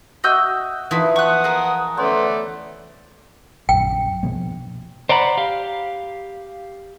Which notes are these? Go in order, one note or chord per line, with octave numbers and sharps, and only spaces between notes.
F#4 D#5 E5 E6 G6
E3 F3 D#4 B4
F#5 C#6 D#6 F#6
G#4 A#4
A3 B3 C#4 C5 D5
A#1 F#2 G5
B2 F3 A#3
C5 D5 F#5 A#5 B5
G4 F5